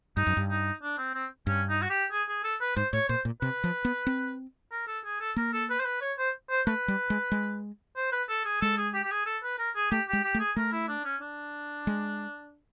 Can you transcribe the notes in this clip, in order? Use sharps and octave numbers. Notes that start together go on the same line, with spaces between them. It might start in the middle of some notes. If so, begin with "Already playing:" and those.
G2 D#4
F#2
G2
D#4
D4
C4
C4
G2 C#4
D#4
F#4
G4
G#4
G#4
A4
B4
G#2 C5
A2 C#5
A#2 C5
A#2
C3 B4
F3
B3
C4
A#4
A4
G#4
A4
A#3 A#4
A4
B4
C5
B4
C#5
C5
C5
A3 B4
G3
G#3
G#3
C5
B4
A4
G#4
G#3 A4
G#4
G4
G4
G#4
A4
B4
A#4
G#4
A3 G4
G#3 G4
G4
A3
G#4
A3 A#4
E4
D4
C#4
D4
G#3